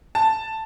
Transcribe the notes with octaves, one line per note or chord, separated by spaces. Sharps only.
A5